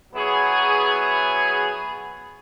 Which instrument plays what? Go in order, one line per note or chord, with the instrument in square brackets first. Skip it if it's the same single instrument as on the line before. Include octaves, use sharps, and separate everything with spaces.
[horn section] F#3 B3 E4 G#4 C#5